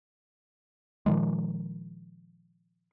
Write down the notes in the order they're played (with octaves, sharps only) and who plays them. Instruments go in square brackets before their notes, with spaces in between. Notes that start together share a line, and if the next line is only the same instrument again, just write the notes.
[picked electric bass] A#2 D#3 F3 G#3